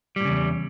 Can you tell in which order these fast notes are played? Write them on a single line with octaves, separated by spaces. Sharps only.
G3 A2 C#3 E2